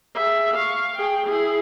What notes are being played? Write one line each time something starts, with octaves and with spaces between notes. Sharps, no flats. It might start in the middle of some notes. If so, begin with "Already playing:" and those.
G#4 E5
F5 C#6
G#4 G5
E4 G#4